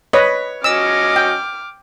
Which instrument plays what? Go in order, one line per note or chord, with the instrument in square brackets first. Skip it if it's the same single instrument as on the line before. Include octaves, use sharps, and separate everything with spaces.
[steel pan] B4 D#5 [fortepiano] C#5
[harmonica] F#3 C#4 D#5 [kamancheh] D6 F6 [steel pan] E6
[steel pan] G5